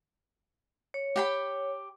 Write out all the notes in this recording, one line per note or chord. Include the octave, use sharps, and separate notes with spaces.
C#5
G4 G5 B5